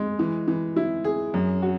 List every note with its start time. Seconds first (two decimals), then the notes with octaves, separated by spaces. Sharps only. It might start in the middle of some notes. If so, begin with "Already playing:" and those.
Already playing: G#3 D#4
0.19 E3
0.48 E3
0.76 E4
1.04 G#4
1.34 F#2
1.62 F#4